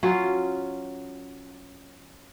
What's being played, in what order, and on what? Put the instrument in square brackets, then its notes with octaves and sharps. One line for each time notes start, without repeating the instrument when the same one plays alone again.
[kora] F#3 C#4 F4